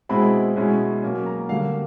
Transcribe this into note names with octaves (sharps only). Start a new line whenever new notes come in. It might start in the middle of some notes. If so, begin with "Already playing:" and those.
B2 G#3 C4 E4 B5
B2 G#3 C#4 E4
B2 F#3 A#3 C#4
A#5
D3 G3 A#3 F5